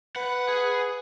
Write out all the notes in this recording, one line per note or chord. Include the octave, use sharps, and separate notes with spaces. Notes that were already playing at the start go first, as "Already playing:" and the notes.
B4 F#5
G#4